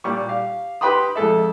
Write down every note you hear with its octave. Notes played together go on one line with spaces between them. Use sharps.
A#2 G3 C#6
G4 F5
G4 B4 G5 B5 C6 D#6
F2 G#3 A4 E5